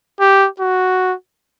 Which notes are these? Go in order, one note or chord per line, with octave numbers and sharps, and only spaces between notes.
G4
F#4